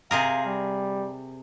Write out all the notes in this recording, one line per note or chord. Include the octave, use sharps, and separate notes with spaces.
C3 G#4 A#4 F5
G3